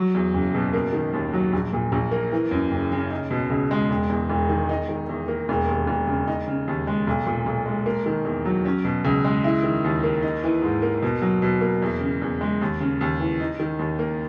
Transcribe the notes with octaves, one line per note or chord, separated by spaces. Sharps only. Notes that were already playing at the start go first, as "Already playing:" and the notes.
Already playing: F#3
E2
F#1
B2
A#3
D#3
D#2
F#3
A#1
A#2
A#1
A#3
E3
F#2
F#1
C#3
D#4
B2
C#2
G#3
E1
E2
E1
D#3
D#4
D#3
E2
A#3
E1
D#2
E1
C#3
D#4
C#3
D#2
G#3
B1
A#2
B1
G#3
A#3
D#3
E2
F#3
C#4
B2
C#2
G#3
E4
D#3
D#2
A#3
D#4
E3
G#2
A#3
B2
F#3
B2
A#3
E2
C#3
E2
G#3
D#2
C#3
D#2
E3
D#4
D#3
D#2
A#3